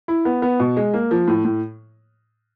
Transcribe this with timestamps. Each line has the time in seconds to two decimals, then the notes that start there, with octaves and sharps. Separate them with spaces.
0.08 E4
0.25 B3
0.42 B3
0.60 B2
0.77 G#3
0.94 A#3
1.11 F3
1.28 A2
1.45 A2